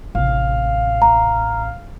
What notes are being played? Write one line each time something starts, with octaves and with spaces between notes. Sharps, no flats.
A1 C3 F5
A#5